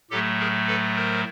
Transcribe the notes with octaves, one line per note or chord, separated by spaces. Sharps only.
A2 F#3 A3 G4 A4
G#4 A#4
A4 B4
A#4 C5